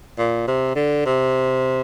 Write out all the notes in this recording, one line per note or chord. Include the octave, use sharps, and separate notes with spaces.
A#2
C3
D3
C3